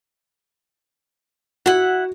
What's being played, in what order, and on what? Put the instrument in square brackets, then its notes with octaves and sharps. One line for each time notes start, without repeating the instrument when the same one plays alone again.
[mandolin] E4 F#5 [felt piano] F#4